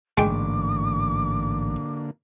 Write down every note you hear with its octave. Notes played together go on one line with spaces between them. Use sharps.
A1 G#2 D3 G#3 A#3 G5 D6